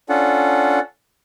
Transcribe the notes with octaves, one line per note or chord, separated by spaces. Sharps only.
C#4 D4 F4 A4 F#5